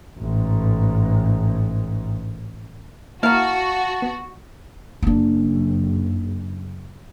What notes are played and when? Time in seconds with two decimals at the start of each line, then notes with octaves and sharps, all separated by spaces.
0.19 A1 G#2
3.23 A#3 E4 F#4 A#4 F5 A5
4.02 B3
5.03 F#1 A#3 D4